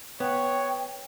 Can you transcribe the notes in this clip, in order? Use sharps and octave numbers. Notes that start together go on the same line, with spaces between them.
B3 C#5 G5